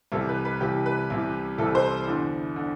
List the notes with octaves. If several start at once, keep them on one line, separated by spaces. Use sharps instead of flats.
C2 C3 E3 A4
B4
B4
C2 C3 E3 G4
B4
C2 C3 E3
C2 C3 E3 A4
C5
E2 D3
D3